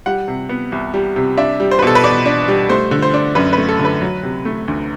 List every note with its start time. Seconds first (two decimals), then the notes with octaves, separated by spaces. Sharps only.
0.06 G3 F#5
0.28 C3
0.49 B3
0.72 C2
0.94 G3
1.16 C3
1.37 D4 E5
1.60 G3
1.71 C5
1.79 B4
1.82 B2 A4
1.95 B4
2.04 B2 D5
2.26 D4
2.48 G3
2.69 A3 C5
2.91 D3
3.02 C5
3.14 D4
3.35 F#2 B4
3.53 B4
3.57 A3
3.69 A4
3.79 D3
3.85 B4
4.02 F#3
4.23 C3
4.45 A3
4.68 D2